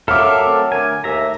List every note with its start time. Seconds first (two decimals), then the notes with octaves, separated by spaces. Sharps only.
0.08 F#3 A4 A#4 E5 F5 D6 F6
0.46 A3 C4
0.72 D3 A3 A#4 G#5
1.04 D#2 A3 E5 A#5